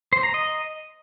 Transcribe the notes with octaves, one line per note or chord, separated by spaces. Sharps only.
C5
A#5
D#5